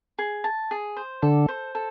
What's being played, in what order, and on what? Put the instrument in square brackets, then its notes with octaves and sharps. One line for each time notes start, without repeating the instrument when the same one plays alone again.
[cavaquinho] G#4
A5
G#4
C5
[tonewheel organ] D3 [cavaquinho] A4
[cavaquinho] C5
A4